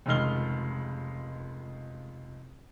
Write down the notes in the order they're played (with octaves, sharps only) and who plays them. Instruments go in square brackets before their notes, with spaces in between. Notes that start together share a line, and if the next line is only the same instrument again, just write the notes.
[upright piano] F1 C#2 D#3 G#3 F6 G7